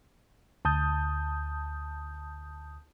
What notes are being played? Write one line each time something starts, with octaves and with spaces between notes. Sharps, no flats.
D2 A5 D#6 G6